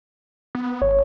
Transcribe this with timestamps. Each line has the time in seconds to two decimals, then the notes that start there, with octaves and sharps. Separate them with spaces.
0.55 B3
0.82 G#1 C#5